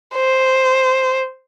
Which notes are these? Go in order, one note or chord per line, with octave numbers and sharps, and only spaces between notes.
C5